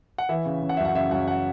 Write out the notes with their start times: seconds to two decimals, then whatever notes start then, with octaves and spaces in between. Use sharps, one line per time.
0.18 F#5
0.29 E3 E5
0.46 C#3
0.62 C#3
0.69 F#5
0.77 E5
0.79 F#2
0.85 F#5
0.95 C#3 E5
1.11 F#2 F#5
1.28 F#5